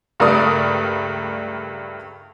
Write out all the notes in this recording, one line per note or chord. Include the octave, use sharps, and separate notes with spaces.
C#2 G2 A3 A#4 D5 D#6